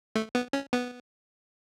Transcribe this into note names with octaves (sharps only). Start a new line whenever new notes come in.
A3
B3
C#4
B3